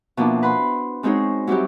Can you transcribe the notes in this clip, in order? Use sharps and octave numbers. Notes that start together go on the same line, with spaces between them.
B2 F3 A#3 D4 E4
B4 F#5 B5 C6
G#3 C4 D#4 F#4 G#4 C#5
F#3 G3 C4 E4 F#4 G4